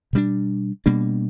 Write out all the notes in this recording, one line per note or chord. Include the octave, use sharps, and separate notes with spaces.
B2 G3 A#3 D4
B2 G3 A#3 D4